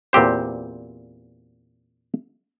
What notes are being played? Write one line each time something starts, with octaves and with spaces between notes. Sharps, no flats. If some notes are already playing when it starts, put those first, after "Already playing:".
E2 A#2 C4 G4 C5